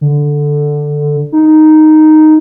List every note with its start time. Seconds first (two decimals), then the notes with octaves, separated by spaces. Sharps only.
0.01 D3
1.32 D#4